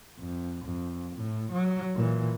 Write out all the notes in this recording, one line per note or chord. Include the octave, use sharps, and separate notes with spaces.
F2
F2
A2
F#3
A#2 E3